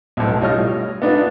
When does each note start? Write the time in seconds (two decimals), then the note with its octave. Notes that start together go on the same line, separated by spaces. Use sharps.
0.17 B1 A2
0.42 G3 F4 C#5 D#5 F6
1.02 B3 D4 D#4 F4